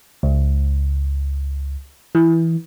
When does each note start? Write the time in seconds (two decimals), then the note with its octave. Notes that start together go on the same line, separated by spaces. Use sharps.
0.23 C#2
2.15 E3